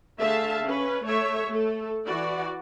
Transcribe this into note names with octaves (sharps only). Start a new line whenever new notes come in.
D3 A3 G#4 E5 F5 A5
C#4 B4
A3 C#5 E5
A3 A4
E3 F#4 D5